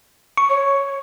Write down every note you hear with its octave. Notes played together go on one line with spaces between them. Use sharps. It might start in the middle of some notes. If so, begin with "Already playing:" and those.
C#6
C#5